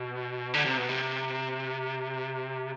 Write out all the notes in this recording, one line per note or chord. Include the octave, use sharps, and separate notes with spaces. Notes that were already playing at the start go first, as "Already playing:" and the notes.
Already playing: B2
D3
C3
B2
C3